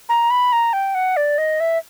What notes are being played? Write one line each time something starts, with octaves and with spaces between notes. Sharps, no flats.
A#5
B5
A#5
G5
F#5
D5
D#5
E5